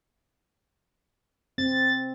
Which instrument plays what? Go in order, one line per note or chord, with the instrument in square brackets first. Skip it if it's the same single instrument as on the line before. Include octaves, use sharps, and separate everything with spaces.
[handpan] C4 [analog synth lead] A6